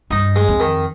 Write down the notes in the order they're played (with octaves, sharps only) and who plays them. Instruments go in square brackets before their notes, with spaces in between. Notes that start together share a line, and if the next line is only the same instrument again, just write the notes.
[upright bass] G2 [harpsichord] D#4
[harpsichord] G#3
[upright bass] F2
[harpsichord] D#3